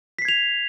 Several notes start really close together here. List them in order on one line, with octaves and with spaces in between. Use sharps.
B6 C7 G#6 F7